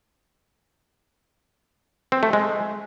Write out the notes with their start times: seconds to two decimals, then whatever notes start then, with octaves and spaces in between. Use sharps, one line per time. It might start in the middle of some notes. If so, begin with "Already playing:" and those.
2.12 C4
2.23 A3
2.33 G#3